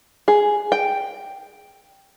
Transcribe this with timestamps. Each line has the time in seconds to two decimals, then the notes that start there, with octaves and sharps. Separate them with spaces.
0.28 G#4
0.72 G5